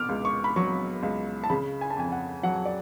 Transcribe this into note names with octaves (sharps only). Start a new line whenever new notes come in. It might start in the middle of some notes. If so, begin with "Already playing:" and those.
Already playing: B2 D6 F6
C#2
C#6
B5
F#3 C#6
C#2
A5
C#3 B5
G#5
A5
F2 G#5
F#5
F#3 F#5
D5